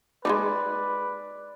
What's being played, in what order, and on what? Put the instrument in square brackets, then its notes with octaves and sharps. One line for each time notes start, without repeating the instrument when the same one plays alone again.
[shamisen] G#3 D4 D#4 [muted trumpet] B4 [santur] D5